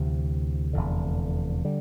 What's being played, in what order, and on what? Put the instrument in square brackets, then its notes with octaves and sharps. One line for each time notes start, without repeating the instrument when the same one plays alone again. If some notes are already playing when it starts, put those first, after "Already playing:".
Already playing: [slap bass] D2 C3 E3
F1 E2 D3
D3 G3